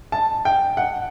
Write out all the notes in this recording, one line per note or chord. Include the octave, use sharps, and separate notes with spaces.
A5
G5
F#5